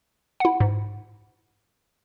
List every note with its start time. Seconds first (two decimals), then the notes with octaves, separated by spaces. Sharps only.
0.40 E4 F#5
0.60 G#2